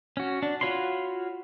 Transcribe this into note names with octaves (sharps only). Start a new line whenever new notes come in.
C#4 F#4
D4
F4 F#4 C#5 B5 C6